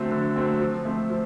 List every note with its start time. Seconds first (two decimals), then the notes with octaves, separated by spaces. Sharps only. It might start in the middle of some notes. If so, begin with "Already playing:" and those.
Already playing: D3 F#3 A3 C4
0.11 D3
0.36 F#3 A3 C4
0.60 F3
0.85 A3 C4
1.10 F3